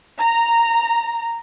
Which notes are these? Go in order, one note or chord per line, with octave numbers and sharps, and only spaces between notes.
A#5